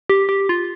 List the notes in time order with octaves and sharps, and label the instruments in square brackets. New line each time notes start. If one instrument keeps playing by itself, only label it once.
[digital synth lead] G4
G4
F4